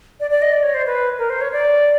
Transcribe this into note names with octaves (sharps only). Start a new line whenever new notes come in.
D5
D5
D#5
D5
C#5
C5
B4
A#4
C5
C#5
D5